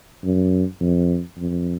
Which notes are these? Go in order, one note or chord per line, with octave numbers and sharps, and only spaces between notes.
F#2
F2
F2